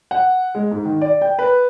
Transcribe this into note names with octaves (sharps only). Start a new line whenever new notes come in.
F#5
G#3
G#2
D#3
D5
G5
B4